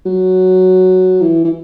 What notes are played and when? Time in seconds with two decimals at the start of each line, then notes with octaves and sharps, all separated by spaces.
0.06 F#3
1.21 E3
1.44 E3